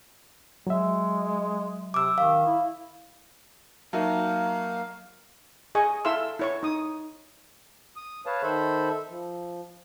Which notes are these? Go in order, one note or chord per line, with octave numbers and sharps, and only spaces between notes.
F#3 G#3 E5
C3 D6 E6
D#3 F5
E4
F#3 A#3 D#4 F#4 A#4 E5 F5 A5
G#4 D#5 G#5 C#6
E4 A4 E5 F5 C6 E6
E4 C#5 C#6
D#4 D#6
D#6
B4 C#5 F5 A5
D#3 A4 C5 E5 B5
F3